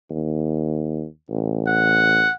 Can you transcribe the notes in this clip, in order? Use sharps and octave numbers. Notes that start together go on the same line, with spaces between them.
D#2
A1
F#5